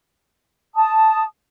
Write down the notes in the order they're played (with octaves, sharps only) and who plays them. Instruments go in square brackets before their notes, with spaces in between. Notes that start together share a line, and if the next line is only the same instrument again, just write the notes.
[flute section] A5 D#6